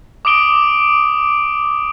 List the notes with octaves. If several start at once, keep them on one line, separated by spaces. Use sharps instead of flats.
D6 D#6 D7 G7